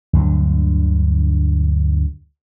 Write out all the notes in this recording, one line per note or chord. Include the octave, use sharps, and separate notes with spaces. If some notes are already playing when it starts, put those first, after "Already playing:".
D2 G2 D3 F#3